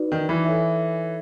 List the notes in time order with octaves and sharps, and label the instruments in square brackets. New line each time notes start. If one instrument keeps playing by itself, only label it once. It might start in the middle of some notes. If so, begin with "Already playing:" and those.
Already playing: [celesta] D#4 F#4 B4 D5
[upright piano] D#3
E3
[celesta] A4 C#5 E5